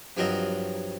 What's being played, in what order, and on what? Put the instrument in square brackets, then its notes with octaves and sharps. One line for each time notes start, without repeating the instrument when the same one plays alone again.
[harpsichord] G2 F3 F#3 C4 A#4 D#5